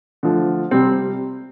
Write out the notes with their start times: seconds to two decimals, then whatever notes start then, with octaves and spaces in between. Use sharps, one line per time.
0.23 D3 F3 A3
0.71 C3 G3 C4